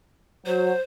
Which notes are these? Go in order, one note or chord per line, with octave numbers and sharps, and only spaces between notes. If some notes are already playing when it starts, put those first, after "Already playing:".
F#3 C5